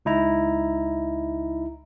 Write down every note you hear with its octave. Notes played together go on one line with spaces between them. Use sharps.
C#2 D#4 E4 A#5